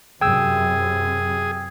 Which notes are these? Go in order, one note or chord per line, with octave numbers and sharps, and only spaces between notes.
F#2 C3 G#4 G5 E6